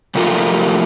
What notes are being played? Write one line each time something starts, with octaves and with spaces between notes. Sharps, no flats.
C3 F3 F#3 A3 F4 A#4